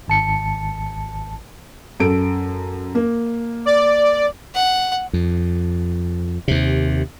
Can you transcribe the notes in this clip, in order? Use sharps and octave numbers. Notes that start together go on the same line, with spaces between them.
G#1 A5 C#7
F#2 A4 D7
A#3
D5
F#5
F2
D#2 C3